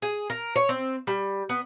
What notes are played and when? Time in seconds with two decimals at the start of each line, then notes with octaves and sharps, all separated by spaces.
0.02 G#4
0.30 A#4
0.56 C#5
0.69 C4
1.07 G3
1.49 B3